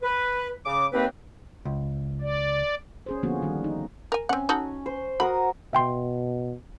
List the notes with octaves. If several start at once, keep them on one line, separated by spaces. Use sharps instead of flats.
B4
C#3 D6
D#2 A#3 C4 B4
C#2
D5
C#4 G#4 C5
D3 F3 A#3 B3 C#4 F#4
D#3 G3
D#4
A#4 G#5
C4 C#4 F#5
D#4 F#4 A4
C5
F#4 A#4 B5 D#6
B2 E5 G5 C6